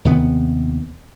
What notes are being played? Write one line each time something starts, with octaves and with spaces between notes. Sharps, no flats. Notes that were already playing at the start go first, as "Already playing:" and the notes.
D#2 C3 B3